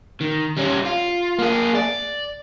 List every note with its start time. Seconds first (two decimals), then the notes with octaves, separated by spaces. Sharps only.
0.21 D#3
0.57 G3 C#4
0.86 F4
1.38 A#3 G#4
1.75 D5